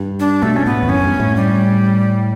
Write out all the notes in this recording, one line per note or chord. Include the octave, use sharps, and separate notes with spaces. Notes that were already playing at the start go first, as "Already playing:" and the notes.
Already playing: G2
D4
B2 A3
C#4
A2 B3
E2
F#2 C#4
G2
A2
G3